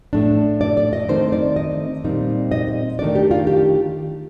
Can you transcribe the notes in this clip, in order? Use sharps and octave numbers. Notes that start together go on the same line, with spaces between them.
A2 A3 D4
D5
D5
D#5
D#3 A3 C4 D#4 C5
D5
D#5
A#2 G3 C4 D#4
D#5
D#3 A3 D4 D5
G4
F4
G4